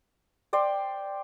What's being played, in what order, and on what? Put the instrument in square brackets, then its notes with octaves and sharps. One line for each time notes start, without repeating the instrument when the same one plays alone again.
[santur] C5 D5 G5 C6